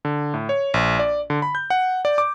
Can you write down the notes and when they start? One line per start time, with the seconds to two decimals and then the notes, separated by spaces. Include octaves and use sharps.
0.05 D3
0.34 A2
0.49 C#5
0.74 A#1
0.99 D5
1.30 D3
1.42 B5
1.55 G6
1.70 F#5
2.05 D5
2.18 D6